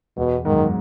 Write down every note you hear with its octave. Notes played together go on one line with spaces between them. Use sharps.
E2 B2
G#2 D#3
F#2